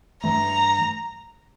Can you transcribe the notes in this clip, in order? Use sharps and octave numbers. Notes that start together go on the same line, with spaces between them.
G2 E3 A3 A#5